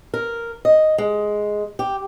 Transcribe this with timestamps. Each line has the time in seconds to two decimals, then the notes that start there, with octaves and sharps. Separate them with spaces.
0.14 A#4
0.65 D#5
0.98 G#3
1.79 G4